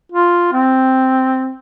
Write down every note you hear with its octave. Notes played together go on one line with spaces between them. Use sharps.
F4
C4